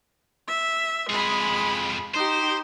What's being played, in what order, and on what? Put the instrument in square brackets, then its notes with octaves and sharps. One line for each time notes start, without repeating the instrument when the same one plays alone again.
[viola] E5
[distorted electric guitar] F2 G#4 [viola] G#3 B5
[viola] D#4 G4 [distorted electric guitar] C5